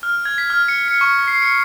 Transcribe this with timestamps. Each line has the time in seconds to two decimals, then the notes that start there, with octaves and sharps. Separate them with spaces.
0.03 F6
0.25 G#6
0.38 B6
0.50 F6
0.68 C#7
0.88 C#7
1.01 C#6
1.28 C7
1.42 C#7